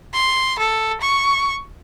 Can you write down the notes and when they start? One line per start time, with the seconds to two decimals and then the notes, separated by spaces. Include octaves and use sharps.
0.14 C6
0.59 A4
1.01 C#6